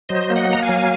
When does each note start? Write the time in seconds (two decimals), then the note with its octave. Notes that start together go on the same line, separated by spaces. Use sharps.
0.09 F#3 C5 D#5
0.30 A#3
0.36 D#5 F#5
0.50 A#3 A#5
0.62 F5 G#5
0.69 F#3